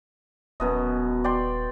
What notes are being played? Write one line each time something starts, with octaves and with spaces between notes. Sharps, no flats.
D#1 F#2 B2 D#5
D5 G5 C6